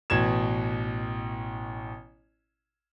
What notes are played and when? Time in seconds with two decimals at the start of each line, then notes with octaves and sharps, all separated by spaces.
0.10 A1 B2 G#6 E7